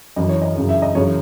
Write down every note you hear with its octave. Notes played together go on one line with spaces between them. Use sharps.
F#2 E3 D#5
C#5
D#5
F#2 C#3 E3
E5
D#5
F#2 C#3 E3 C#5